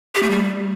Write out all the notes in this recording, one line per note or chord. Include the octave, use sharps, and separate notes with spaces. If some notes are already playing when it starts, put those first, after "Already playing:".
G4
A3
G3